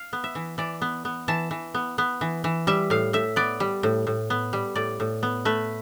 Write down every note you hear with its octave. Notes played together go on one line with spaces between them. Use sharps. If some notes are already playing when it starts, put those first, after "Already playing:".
Already playing: F5
B3
E5
E3
E3 D5
B3
B3
E3 A5
E3
B3
B3
E3
E3
G3 E5
A2 F5
A2 E5
B3 D5
G3
A2
A2
B3
G3
A2 D5
A2
B3
A3 B4